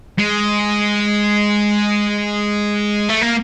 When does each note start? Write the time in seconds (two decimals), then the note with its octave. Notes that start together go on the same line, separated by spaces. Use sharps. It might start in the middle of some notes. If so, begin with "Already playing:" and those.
0.18 G#3
3.10 A3
3.22 A#3